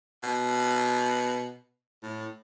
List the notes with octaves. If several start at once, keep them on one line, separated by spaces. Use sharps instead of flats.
B2
A2